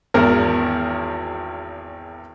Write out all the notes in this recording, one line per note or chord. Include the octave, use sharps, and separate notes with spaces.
G#1 E2 A#4